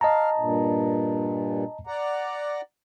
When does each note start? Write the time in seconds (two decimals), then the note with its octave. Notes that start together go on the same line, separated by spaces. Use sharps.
0.01 D#5 F5 A5 A#5
0.38 G2 A#2
1.87 D5 F#5 A#5